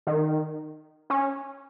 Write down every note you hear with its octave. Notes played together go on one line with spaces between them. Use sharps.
D#3
C#4